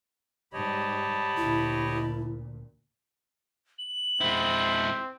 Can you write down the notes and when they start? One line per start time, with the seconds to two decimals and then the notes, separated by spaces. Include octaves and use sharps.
0.53 G#2 G3 G4 C#5 D#5 A5 B5
1.37 D2 A#2 E4
3.78 F#7
4.21 G#3 C4 E4